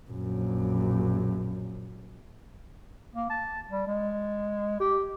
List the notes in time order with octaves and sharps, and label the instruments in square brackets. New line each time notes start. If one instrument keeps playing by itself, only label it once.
[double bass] A#1 F#2
[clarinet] A#3
A5
G3
G#3
G4